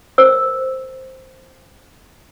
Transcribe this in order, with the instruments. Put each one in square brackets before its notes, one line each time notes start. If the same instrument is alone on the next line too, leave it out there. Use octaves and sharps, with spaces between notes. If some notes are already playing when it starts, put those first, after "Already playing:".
[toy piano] A#4 C5 E6